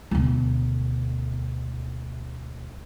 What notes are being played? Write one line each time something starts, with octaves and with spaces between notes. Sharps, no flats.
D2 B2